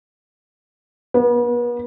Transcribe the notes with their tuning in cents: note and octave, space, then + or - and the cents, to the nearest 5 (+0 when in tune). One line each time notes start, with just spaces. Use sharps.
B3 -40